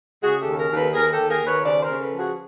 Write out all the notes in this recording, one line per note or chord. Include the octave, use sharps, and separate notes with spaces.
C#3 F#4 G#4
G4 A4
D#2
G#4 A#4
D#2
A4 B4
D#2 G#4 A#4
G4 A4
D#2
G#4 A#4
D#2
B4 C#5
C#3 C5 D5
A#4 C5
C#3
A4 B4
F3
F#4 G#4